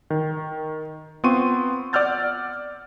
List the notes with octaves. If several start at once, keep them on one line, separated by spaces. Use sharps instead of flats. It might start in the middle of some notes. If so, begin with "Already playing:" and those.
D#3
B3 C4 F4 C6 C#6 D#7
D5 F#5 E6 F6 G6 A6